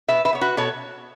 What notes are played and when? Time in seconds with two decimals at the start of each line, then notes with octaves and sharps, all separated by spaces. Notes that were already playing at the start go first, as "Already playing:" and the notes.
0.08 B2 B4 E5
0.25 B4 E5
0.33 B3 C#5
0.41 F#4 B4
0.57 B2 A4 C#5